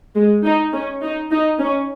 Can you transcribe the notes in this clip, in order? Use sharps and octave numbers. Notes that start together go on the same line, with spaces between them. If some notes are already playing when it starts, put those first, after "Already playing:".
G#3
D#4
C#4
D#4
D#4
C#4